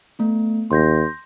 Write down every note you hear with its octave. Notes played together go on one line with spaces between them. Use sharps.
A3 B3
D#2 C6 G6 A#6